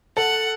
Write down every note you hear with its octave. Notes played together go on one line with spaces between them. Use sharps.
A4 F#5